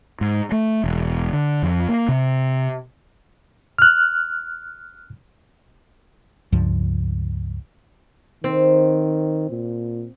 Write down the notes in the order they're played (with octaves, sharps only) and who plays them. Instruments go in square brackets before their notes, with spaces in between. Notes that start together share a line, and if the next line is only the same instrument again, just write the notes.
[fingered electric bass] G#2
A3
E1
D3
F2
A#3
C3
[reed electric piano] F6 F#6
[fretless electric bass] C#2 G2 F3
[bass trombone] D#3 [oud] C4
[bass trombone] A#2